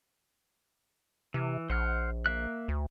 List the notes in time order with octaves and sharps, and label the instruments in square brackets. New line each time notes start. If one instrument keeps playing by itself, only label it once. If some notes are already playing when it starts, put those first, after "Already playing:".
[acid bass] C3 [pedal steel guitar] E3
[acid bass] A#1 [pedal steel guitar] C5 F#5 F6
[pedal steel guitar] A#3 E5 F#6
[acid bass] D2